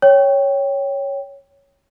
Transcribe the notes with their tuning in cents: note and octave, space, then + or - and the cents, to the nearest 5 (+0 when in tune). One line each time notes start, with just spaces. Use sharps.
C#5 +0 G5 +0